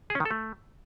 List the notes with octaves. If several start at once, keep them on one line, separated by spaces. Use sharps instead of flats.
G#4
C#4
D#3
A4
A3